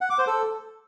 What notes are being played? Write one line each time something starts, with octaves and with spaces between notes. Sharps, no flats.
F#5
D6
C5
A4